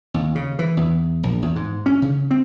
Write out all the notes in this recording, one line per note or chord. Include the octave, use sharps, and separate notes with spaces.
D#2
C#3
E3
E2
A#1
E2
G#2
C#4
C#3
C4